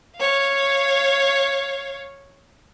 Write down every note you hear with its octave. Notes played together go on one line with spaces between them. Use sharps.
C#5 F5